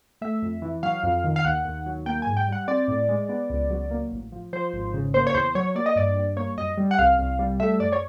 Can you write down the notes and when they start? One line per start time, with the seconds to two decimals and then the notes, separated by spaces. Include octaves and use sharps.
0.21 A3 E5
0.42 F2
0.62 E3
0.83 F#3 F5
1.03 F2
1.24 D#3
1.36 F5
1.45 D#2 F#5
1.65 D#2
1.86 F#3
2.06 A#3 G5
2.22 G#2 G#5
2.37 G5
2.48 G3 F#5
2.68 C4 D5
2.88 A2
3.09 G#3
3.29 B3
3.50 C#2
3.70 F#3
3.91 A#3
4.12 A1
4.32 F3
4.53 F3 C5
4.73 G#1
4.94 C#3
5.14 A#3 C5
5.27 C#5
5.34 E2 C5
5.55 F#3 C#5
5.75 A#3 D5
5.86 D#5
5.96 G2 D5
6.16 G3
6.37 A#3 C#5
6.58 F#2 D#5
6.77 G3
6.91 F#5
6.99 C2 F5
7.19 C2
7.39 G3
7.60 A3 E5
7.80 F#2 D5
7.92 C#5